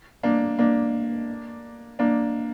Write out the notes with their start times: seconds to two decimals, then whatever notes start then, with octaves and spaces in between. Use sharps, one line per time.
0.23 A#3 D4
0.59 A#3 D4
1.99 A#3 D4